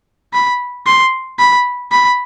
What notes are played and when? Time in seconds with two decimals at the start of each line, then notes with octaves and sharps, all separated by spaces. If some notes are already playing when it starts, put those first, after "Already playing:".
0.33 B5
0.86 C6
1.39 B5
1.92 B5